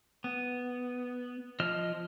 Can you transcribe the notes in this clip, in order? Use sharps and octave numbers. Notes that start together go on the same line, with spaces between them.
B3
F3 D#5 F6